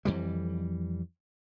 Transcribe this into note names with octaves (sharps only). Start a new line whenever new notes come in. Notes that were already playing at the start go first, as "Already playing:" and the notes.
F2 E3 G3